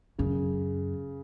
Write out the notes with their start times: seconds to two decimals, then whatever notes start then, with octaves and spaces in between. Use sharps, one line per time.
0.18 F#2 C#3